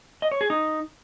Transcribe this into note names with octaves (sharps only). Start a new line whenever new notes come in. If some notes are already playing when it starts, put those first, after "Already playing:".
D#5
C#5
G#4
D#4